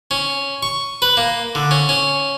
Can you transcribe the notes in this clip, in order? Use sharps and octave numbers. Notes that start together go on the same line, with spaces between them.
C#4
C#6
B4
A#3
D3
C#4
C#4